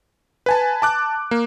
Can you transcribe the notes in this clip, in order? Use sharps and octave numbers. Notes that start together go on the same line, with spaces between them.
B4 G#5 A5
A5 D6 F#6
A#3